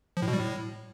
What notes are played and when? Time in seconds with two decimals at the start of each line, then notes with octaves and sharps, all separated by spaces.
0.17 F3
0.22 A2
0.28 B2
0.33 G3
0.39 A2